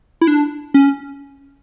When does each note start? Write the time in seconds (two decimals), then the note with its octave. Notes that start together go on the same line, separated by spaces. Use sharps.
0.21 E4
0.27 D4
0.74 C#4